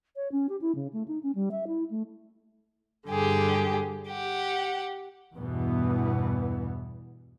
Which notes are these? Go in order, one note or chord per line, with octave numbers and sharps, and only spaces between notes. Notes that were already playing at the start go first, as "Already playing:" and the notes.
C#5
C#4
G4
E4
C#3
A3
D#4
C#4
G3
E5
E4
A3
G2 D3 G4 G#4
G4 F#5
E2 G2 B2 E3 B3